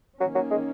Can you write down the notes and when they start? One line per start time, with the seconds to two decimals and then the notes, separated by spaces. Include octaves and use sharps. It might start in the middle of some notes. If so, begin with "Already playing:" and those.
0.20 D#3 F#3 A#3 C#4
0.35 F#3
0.51 G#3